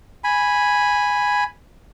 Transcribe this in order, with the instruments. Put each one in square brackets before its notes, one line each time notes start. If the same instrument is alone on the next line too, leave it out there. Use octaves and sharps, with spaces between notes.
[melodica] G#5 B5